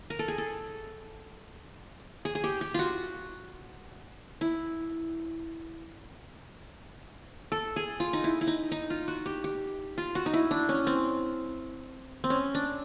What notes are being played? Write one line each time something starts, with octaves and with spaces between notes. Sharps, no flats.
A#4
A4
G#4
A4
G#4
G#4
G4
G4
F4 F#4
E4
A4
G#4
F4
D#4
E4
E4
D#4
D#4
F4
F#4
G4
G4
F4
F#4
D#4
E4
D4
C#4
C4
C4
C#4
D4